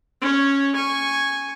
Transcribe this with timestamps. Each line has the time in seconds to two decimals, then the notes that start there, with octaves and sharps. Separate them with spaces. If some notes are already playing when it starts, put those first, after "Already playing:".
0.22 C#4 C#5
0.75 G#5 C#6